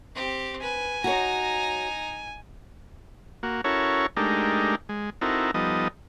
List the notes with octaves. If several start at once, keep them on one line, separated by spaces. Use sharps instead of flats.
C4 G4
B4 G#5
D#4 F#4 C#5 A#5
A#3 F#4
C#4 E4 F#4 A4 A#4 C#5
G#3 A3 D4 D#4 G4 A#4
G#3
C4 D#4 E4 F#4 A4 A#4
F3 G3 B3 D#4 A4 D#5